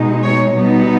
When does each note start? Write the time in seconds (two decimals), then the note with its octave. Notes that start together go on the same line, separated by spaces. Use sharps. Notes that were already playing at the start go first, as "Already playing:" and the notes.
Already playing: B2 G#3 D#4
0.24 C#5
0.55 B2 G3 B3 D#4